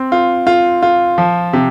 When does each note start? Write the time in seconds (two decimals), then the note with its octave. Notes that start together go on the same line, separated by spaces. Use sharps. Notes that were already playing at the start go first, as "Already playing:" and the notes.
Already playing: C4
0.12 F4
0.47 F4
0.82 F4
1.18 F3
1.53 C3